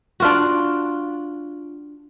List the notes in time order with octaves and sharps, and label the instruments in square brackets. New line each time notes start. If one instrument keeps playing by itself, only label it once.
[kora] D4 F4 F#4